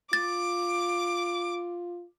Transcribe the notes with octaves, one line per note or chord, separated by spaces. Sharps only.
F4 D6 A6